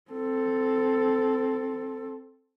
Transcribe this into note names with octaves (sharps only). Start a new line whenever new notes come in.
C4 A4